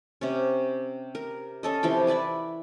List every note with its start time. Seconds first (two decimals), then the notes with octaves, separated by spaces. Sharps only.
0.21 C3 C#4
1.15 A#4
1.63 C#4 A4 D#5
1.83 C3 E3 F3 G5
2.07 E4 B4 D5 E5